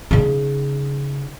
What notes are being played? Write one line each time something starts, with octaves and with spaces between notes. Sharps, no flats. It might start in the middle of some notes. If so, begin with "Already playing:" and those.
C#3 D#4